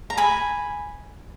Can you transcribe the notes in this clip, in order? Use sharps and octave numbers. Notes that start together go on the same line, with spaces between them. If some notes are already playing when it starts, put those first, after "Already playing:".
A#5
G#5 B5